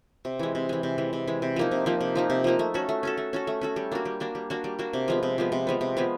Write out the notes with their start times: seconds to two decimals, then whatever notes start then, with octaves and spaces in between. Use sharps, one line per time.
0.25 C3
0.39 E3 G#3
0.55 C3
0.69 E3 G#3
0.83 C3
0.98 E3 G#3
1.13 C3
1.28 E3 G#3
1.42 C3
1.56 F3 A#3 D#4
1.71 C3
1.86 F3 A#3 D#4
2.01 C3
2.16 F3 A#3 D#4
2.30 C3
2.44 F3 A#3 D#4
2.59 A3
2.74 C#4 F#4 A4
2.89 A3
3.03 C#4 F#4 A4
3.18 A3
3.33 C#4 F#4 A4
3.47 A3
3.62 C#4 F#4 A4
3.76 G3
3.92 A#3 D4 F#4
4.05 G3
4.20 A#3 D4 F#4
4.35 G3
4.50 A#3 D4 F#4
4.64 G3
4.79 A#3 D4 F#4
4.93 C3
5.08 F3 G#3 B3
5.23 C3
5.38 F3 G#3 B3
5.52 C3
5.67 F3 G#3 B3
5.81 C3
5.97 F3 G#3 B3